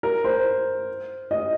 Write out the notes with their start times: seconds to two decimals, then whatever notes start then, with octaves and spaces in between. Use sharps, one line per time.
0.03 A#4
0.24 C5
1.31 D#5